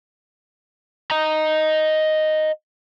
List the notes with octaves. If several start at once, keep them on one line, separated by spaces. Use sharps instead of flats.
D#5 A#5